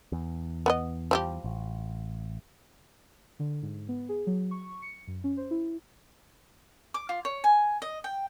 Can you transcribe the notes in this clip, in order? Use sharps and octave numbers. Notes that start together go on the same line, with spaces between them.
E2
B3 B4 D#5
F3 G3 G4
A1
D3
G#2
B3
G#4
F#3
C#6
C#7
F#2
C#4
C5
E4
D6
F4
C#5
G#5
D#5
G5